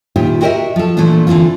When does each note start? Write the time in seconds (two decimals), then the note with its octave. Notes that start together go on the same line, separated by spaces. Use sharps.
0.16 A#2 D#3 E4 F4 G4
0.41 F#4 G4 A#4 C#5 D#5 E5
0.76 F3 A4
0.97 A#2 E3 F3 A3 D4
1.27 D3 E3 F3 C4 F4